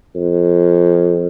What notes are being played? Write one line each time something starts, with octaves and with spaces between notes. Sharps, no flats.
F2